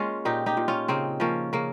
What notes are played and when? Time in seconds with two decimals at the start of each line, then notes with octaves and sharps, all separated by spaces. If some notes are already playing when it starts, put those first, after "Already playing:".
Already playing: G#3 A#3 C#4 F4
0.25 A#2 D#4 G4
0.46 D#4 G4
0.57 A#2
0.68 C#4 F4
0.88 C#3 C4 D#4
1.20 F3 A#3 C#4
1.53 C#3 A#3